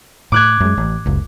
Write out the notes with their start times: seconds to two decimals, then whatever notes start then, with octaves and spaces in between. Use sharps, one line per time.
0.32 A2 D6 F#6 G#6
0.60 F#2 G#3
0.78 A1
1.06 F#1 C#2